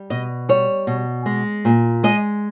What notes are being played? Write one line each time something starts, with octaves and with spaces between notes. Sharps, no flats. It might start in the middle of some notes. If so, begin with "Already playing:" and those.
Already playing: G3
B2 D#5
G3 C#5
B2
G#3
A#2
G#3 D#5